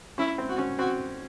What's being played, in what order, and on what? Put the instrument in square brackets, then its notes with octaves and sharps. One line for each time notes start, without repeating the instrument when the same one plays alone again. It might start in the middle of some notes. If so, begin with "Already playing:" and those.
[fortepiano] C#4 [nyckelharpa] E4
[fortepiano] C4
[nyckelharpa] F#4
[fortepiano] C#4
[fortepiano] C4 [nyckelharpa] F#4